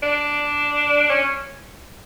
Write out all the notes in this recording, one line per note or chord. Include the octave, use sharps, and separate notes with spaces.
D4
C#4